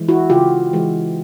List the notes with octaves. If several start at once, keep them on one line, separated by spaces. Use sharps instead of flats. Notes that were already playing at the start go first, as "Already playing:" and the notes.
Already playing: E3 G#3
E4 F#4
C#3 F4 G4
E3 G#3